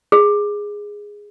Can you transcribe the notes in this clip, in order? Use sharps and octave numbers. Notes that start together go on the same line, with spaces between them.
G#4